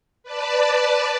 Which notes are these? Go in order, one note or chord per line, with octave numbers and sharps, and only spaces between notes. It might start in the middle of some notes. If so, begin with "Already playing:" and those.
B4 D5 A5